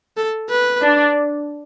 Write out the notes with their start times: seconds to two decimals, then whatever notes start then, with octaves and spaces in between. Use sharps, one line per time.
0.17 A4
0.49 B4
0.82 D4